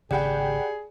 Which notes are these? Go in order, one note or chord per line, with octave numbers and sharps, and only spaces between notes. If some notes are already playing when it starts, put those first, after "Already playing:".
G#1 C#3 G4 G#4 D5 F#5 G5 B5